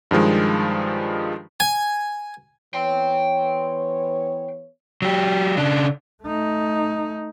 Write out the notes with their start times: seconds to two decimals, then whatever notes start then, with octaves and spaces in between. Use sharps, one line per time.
0.11 G2 D#3 F3 G#3
1.60 G#5
2.74 E3 B3 C#5 G5 C6
5.02 F#3 G4
5.57 C#3 D4
6.23 A3 D#4